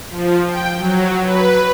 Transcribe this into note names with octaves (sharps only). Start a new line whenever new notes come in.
F3
G5
F#3
B4